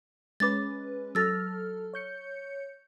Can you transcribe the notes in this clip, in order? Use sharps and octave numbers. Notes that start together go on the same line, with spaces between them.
G#3 C#4 B4 D6 A6
F#3 A4 E6 F6 A6 A#6
C#5 G6 C#7